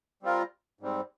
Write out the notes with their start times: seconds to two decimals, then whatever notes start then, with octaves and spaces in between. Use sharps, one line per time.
0.23 G3 C4 F4 A#4
0.81 G#2 G3 C4